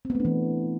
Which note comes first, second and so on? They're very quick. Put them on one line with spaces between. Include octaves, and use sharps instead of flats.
C4 B3 A3 D4 E3